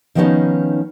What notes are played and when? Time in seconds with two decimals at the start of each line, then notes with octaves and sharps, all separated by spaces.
0.15 D#3 F3 A#3 B3 C#4 D#4